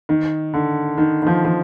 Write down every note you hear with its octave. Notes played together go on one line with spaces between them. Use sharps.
D#3
D3
D#3
D#3
F3
F3